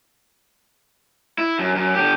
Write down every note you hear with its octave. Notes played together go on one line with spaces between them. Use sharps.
E4
F#2
F#2
D3 G4